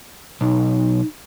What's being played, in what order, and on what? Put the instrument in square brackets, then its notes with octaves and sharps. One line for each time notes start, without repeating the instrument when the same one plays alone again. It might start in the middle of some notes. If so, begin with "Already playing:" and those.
[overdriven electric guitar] B1 [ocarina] D#4